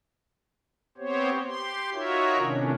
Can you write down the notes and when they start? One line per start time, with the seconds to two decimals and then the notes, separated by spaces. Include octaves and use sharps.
0.98 B3 C4 G4 C5 C#5
1.46 G4 C6
1.93 D#4 F4 F#4 A#4 C#5 E5
2.38 A2 C3 D#3 C#4 D4